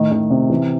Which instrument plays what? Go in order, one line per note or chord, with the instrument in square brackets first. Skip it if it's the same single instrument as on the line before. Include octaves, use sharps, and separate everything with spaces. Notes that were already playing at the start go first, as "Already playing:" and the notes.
Already playing: [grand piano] A2 D#3
D#3
C3
E3